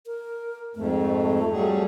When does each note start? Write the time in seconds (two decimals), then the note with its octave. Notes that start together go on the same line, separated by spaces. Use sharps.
0.06 A#4
0.75 F2 G#2 A3
1.52 F#3 G3 G#4